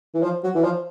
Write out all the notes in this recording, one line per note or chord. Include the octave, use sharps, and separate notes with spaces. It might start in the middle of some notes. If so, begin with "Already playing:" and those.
E3
F3
F#3
E3
F3